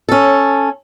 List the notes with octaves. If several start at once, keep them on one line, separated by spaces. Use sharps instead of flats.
C#4 A4